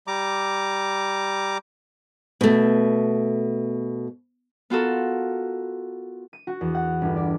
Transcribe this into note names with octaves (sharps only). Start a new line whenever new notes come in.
G3 A#5 D6
B2 A3
B3 F4 F#4 A4 A#4
D#7
F#4
E2
F#5
G1
D5